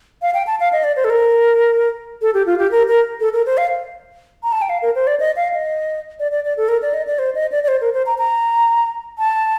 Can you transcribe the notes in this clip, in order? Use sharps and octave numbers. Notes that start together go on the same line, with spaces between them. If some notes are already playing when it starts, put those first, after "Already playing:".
F5
G5
A5
F5
D#5
D5
C5
A4
A#4
A4
G4
F4
G4
A#4
A#4
A4
A#4
C5
F5
A#5
A5
G5
F5
A#4
C5
D5
D#5
F5
D#5
D5
D5
D5
A4
A#4
D5
D#5
D5
C5
D#5
D5
D5
C5
A#4
C5
A#5
A#5
A5